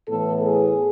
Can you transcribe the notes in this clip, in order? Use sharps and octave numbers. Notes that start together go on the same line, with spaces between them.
A2 E3 B3 A4
G#4